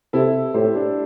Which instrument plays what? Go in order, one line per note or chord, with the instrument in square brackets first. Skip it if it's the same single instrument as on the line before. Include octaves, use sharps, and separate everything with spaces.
[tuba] C3 [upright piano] E4 A4
[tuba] A2 [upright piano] G4 C5
[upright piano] D4 G4